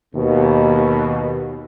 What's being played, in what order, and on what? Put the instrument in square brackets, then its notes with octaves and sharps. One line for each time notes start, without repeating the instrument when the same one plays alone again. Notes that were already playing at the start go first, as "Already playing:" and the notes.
[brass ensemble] D#2 B2